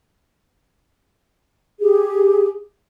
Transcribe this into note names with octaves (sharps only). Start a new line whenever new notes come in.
G4 G#4